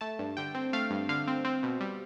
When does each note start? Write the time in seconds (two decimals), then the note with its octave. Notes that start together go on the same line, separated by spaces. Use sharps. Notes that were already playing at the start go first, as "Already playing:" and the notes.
0.01 A3 A5
0.19 G2
0.37 D3 G5
0.55 C4
0.73 A3 F5
0.91 G2
1.09 D3 F5
1.28 C4
1.45 C4
1.63 B2
1.80 G3